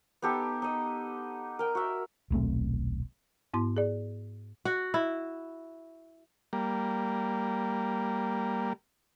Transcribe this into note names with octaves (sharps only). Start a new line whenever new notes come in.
B3 D#4 G4 A4
D#4 D#5
A#4 G5
F#4 E5
D#1 B1 A3 C4
G#2 B3 E4 C6
G#4 D5
F#4
E4
G3 A#3